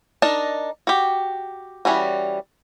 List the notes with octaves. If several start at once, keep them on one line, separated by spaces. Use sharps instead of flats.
D4 D#4 A#4 A5
F#4 G4
E3 G3 C#4 F#4